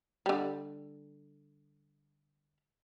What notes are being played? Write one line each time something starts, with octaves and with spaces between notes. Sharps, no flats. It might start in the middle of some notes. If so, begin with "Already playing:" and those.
D3 G3